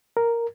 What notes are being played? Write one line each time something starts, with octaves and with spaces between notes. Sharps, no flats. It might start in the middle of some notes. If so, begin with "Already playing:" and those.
A#4